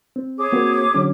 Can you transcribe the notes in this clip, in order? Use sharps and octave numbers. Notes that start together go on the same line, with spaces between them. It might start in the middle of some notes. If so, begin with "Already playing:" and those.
C4
G#4 C#5 D6
A#3 C4 F#4
D3 F#3 C#4